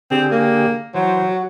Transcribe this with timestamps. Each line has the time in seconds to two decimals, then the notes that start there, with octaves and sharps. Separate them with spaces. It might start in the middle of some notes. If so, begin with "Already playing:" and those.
0.11 D3 C4 G4 G#4
0.31 A#3
0.95 E3 F#3 C5
1.29 F#4